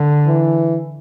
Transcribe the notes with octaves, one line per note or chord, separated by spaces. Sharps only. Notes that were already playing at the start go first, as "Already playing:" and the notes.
Already playing: D3
E3